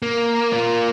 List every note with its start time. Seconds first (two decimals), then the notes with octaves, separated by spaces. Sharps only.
0.02 A#3
0.53 A#3 F4